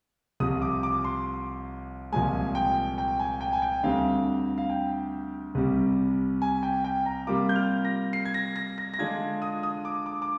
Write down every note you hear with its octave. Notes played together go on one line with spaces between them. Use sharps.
C2 C3 F3 C4 D#6
D6
D6
C6
C2 A#2 F3 G#3 G#5
G5
G5
G#5
G5
G#5
G5
D2 D3 G3 C4 F5
F5
G5
C2 C3 G3
G#5
G5
G5
A#5
C3 G3 A#3 F4 D6
G6
F6
A#6
C7
G#6
A#6
A#6
A#6
A#6
D3 G#3 D4 F4 G#6
D#6
D#6
D6
D6
D6